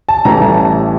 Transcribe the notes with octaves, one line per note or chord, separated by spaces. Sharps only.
A5
A1 A2 E3 G3 A#5
A5